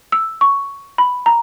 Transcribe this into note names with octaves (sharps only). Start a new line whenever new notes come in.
E6
C#6
B5
A#5